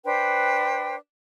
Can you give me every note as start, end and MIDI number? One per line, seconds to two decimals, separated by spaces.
0.04 0.95 62
0.04 0.95 71
0.04 0.95 72
0.04 0.95 79